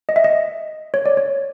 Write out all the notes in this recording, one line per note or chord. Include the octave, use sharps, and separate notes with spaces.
D#5
E5
D#5
C#5
D5
C#5